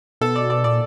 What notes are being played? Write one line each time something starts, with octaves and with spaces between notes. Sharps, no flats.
B2 A4
D5
D5
A#2 D5